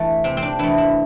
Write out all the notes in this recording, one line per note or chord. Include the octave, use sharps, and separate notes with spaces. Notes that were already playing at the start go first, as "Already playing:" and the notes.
Already playing: E3 A3
C3 C4
C4
D4
E3 A3 E4
E4